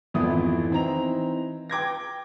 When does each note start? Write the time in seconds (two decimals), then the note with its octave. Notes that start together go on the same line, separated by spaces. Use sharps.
0.14 G#1 F2 E3 B3 E4 D#6
0.71 E3 C4 D#4 A#5 F7
1.70 G5 D6 G#6 A#6